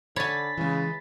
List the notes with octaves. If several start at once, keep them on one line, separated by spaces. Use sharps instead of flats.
D3 C#5 G#5 B5 A6 B6
C#3 E3 G#3